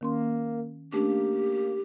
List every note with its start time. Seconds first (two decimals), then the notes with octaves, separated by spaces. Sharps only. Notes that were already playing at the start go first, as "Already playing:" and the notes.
0.01 D#3 A#3 C#4 C6
0.93 A3 A#3 C#4 D4 G4